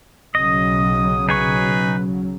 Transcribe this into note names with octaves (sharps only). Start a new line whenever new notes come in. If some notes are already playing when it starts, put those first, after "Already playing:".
B1 C#3 F#3 D#5 D#6
D#4 G#4 B4 C#6